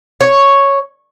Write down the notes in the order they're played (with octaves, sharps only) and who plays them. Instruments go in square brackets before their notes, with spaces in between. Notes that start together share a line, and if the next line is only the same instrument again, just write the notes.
[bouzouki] C#5